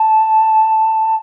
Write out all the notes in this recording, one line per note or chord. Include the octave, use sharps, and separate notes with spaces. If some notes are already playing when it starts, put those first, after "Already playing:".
Already playing: A5